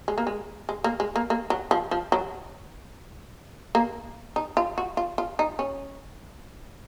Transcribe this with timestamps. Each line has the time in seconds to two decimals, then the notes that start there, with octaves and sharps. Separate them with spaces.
0.08 G#3
0.18 A#3
0.27 G#3
0.69 G#3
0.84 A#3
1.00 G#3
1.16 A#3
1.30 A#3
1.50 F#3
1.71 F3
1.91 F3
2.12 F#3
3.75 A#3
4.36 D#4
4.57 F4
4.78 F#4
4.97 F4
5.18 F4
5.39 D#4
5.59 C#4